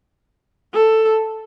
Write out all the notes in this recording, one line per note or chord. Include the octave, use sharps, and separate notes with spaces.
A4